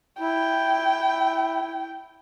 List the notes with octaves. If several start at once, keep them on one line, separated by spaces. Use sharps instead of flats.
E4 G5